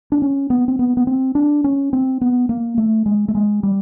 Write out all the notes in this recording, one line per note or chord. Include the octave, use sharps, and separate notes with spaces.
D4
C#4
B3
C4
B3
B3
C4
D4
C#4
C4
B3
A#3
A3
G#3
A3
G#3
G3